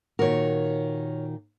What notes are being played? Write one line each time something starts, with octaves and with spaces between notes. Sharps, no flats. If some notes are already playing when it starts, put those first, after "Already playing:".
A#2 D#3 F#4 A#4 C#5